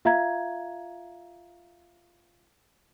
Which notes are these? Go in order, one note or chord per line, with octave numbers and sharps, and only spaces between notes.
F4 E5 F5 A#5 G#6